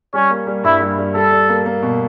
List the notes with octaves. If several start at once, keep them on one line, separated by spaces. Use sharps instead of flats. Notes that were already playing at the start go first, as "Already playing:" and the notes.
G3 C#4
A#3
G3
G2 E4
G2
G3
G3 A4
G3
A#3
A#3
B2